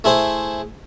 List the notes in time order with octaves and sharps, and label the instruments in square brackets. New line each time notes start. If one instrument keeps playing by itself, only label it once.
[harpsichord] A3 E4 G#4 C5